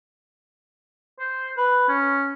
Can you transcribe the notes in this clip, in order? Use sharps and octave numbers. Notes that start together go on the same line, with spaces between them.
C5
B4
C#4